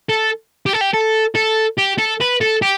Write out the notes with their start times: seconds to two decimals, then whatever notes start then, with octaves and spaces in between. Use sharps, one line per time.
0.10 A4
0.66 G4
0.73 A4
0.81 G4
0.94 A4
1.36 A4
1.78 G4
1.99 A4
2.21 B4
2.41 A4
2.62 G4